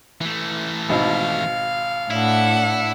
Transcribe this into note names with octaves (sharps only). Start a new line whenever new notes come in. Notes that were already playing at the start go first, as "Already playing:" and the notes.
E3 A3
G#1 B2 D#4 F5
A2 D4 E4 F#5